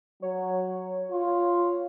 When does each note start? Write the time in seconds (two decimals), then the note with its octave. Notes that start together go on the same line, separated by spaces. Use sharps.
0.22 F#3 C#5
1.11 F4